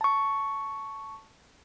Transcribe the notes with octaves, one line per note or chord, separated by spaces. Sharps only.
A5 C#6